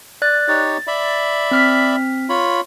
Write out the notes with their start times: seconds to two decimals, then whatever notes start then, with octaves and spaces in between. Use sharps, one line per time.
0.22 D5 F#6 A6
0.48 D#4 G4 C#5 A6
0.87 D5 E5 B5
1.51 C4 F6 B6
2.29 F4 C#5 B5